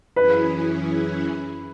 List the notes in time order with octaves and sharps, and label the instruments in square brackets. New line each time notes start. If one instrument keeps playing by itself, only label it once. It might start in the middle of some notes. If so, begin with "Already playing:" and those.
[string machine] F#2 E3 C#4 E4 G#4 [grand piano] B4